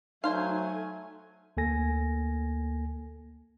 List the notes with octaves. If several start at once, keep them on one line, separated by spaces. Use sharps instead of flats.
F#3 A3 D#4 C5 D5 F5 G#5
D2 A#3 A4 G#5 A#6